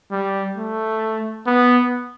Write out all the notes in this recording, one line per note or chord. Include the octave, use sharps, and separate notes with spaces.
G3
A3
B3